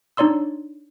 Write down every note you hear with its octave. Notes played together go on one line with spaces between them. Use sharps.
D4 D#4 C#5 D5 C6 E6